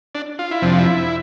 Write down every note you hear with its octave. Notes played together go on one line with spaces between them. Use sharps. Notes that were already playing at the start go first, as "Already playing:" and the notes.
D4
F4
E4
F2 C3 F3 D4
E4